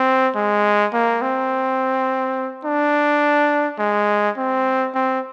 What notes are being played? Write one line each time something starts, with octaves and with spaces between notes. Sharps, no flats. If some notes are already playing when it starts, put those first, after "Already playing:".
Already playing: C4
G#3
A#3
C4
D4
G#3
C4
C4